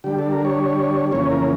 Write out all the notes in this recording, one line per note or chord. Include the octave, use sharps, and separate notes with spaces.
D3 G3 D4 G4
A4
A#4
C#5
F2 C#3 E3 A#3 C#4 C#5
A#4